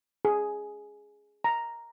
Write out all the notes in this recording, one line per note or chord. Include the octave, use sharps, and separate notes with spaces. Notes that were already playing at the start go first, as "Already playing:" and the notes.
G#4
A#5